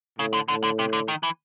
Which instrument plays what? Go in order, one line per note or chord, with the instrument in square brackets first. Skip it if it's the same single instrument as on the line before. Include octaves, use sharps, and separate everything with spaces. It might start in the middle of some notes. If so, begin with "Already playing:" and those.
[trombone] A2 [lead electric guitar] C#3
[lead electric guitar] D3
[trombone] A2 [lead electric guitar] D3
[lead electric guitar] D3
C3
D3
D#3
E3